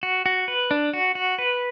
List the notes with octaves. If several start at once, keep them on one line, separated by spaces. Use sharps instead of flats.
F#4
F#4
B4
D4
F#4
F#4
B4